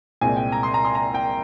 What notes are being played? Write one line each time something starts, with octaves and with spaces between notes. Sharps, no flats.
C2 A#2 G#3 C4 G#5
G5
A#5
C6
A#5
C6
A#5
G5